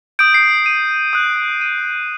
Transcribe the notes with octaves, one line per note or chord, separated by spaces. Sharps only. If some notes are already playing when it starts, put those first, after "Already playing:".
D#6 G6 D7
C7
D#7
D#6 F#6
D#7